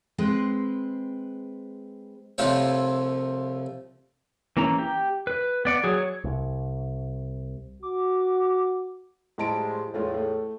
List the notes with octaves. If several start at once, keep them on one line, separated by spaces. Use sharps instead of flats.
G#3 C4 B4
C2 F3 A3 F4 C#5
E3 A#3 C#4 A#5
G4
B4
B3 D5 F#5
F#3 G#4
C#5
C2
F#4 D6
A2 F3 G3 G#3 A5 D7
E2 A2 G#3 A3 F4
A3